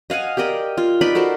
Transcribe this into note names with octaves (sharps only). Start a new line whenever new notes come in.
D#5 F5 F#5 G#5
G4 A#4 D5 D#5
F4
D#4 B4 D5 B5
F#4 A4 A#4 C5